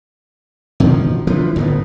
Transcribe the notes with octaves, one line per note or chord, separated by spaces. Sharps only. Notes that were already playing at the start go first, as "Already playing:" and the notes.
B2 D#3 F3
D3 E3 F3
G1 A2 C#3 B3